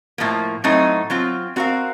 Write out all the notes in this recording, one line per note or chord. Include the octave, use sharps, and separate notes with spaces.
A2 F3 A#3
A2 F#3 A3 C4 D#4
F#3 C4 F4
C4 F#4 A#4 F5